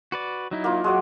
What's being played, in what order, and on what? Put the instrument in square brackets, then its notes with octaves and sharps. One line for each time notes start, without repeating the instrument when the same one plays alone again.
[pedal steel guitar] F#4 B4 D5
F#3 D#4 E4
[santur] A#3 F4
[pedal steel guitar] F#3 [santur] G#3 F#4 D5